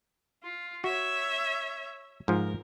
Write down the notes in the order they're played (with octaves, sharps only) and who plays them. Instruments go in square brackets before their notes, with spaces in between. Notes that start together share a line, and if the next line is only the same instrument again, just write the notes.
[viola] F4
[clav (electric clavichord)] F#4 [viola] C#5 E5
[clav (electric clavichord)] G#2 F3 [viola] A#4